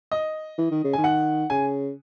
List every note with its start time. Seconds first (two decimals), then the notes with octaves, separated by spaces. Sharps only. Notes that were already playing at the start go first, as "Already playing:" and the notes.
0.12 D#5
0.58 E3
0.71 D#3
0.84 C#3
0.93 D#3 G#5
1.04 F#5
1.50 C#3 G#5